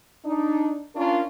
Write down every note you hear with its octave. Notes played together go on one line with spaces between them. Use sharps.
D4 D#4
C#4 D4 F4 A#4